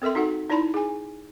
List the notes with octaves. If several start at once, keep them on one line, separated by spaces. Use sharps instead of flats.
C4 A4 A#4 E5 C6
D#4 F#4 A4 F#5
D#4 E4 D5 A5 B5 C6
G#4 G#5